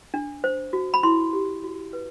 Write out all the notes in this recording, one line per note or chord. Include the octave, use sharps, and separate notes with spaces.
D4
C5
F#4
B5
E4 C6
G4
F#4
B4